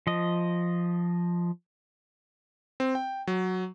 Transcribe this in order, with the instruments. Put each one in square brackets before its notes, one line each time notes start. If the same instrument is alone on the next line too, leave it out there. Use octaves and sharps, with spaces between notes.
[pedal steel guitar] F3 D#5
[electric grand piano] C4
G5
F#3